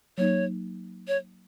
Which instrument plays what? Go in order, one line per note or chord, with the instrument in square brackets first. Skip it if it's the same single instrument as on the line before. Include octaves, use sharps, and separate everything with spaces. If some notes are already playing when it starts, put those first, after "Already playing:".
[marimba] F#3 A#3 D#4 [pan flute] C#5
[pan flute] C#5